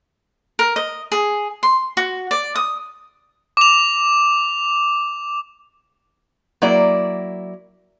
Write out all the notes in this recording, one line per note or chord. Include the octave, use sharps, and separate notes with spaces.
A#4
D#5
G#4
C6
F#4
D5
D#6
D6 F7
F#3 A#3 E4 D5